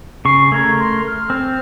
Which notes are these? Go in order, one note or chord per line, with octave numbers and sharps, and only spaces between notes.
C#3 C#6 C7
A3 A#4 G#6
C6
F6
C4